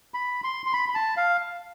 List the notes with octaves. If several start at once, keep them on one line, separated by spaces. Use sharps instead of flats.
B5
C6
C6
B5
B5
A5
F5